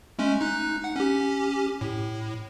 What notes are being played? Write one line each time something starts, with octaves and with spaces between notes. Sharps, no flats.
G#3 A3 C#4
D#4 F#6
F#5
C#4 G4
A2